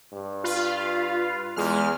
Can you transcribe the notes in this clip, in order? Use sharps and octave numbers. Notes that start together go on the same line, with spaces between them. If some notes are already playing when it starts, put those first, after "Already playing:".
G2
F4 B4 F5
E2 G#3 F6